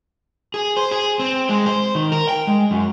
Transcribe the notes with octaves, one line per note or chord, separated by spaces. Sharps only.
G#4
C5
G#4
C4
G#3
C5
D#3
A#4
G5
G#3
F#2